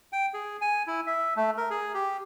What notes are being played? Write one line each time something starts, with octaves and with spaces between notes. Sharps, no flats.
G5
G#4
G#5
E4
E5
A3
A#4
G#4
G4